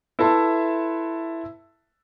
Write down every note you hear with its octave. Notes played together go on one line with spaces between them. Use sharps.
E4 A4 B4 E5 A5 C6